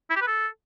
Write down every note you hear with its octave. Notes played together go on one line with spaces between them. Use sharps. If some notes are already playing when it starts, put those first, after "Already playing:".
E4
G4
B4
A4